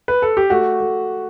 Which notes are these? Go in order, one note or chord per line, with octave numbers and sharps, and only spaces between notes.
B4
A4
G4
A3 F#4
A3